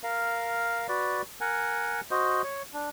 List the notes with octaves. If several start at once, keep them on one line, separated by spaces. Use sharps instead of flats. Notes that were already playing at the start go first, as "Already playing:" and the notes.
A#4 F5
F#4 B4 D5
A#4 F#5 G#5
F#4 C5 D#5
C#5
D4